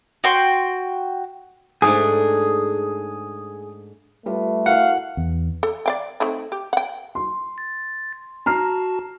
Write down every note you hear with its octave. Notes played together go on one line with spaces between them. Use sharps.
F#4 G5 C6
G#2 A3 D4 G#4
G3 A3 F4 B4
E4 F#4 A#4 F5 F#5
E2
A4
D5 F5 G5
A3 C4 D#4
G4
F#5 G5
C6
A6
F#4 A5 A#5 F6 C7